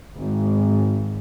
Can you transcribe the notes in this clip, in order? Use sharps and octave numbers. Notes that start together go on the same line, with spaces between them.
G#1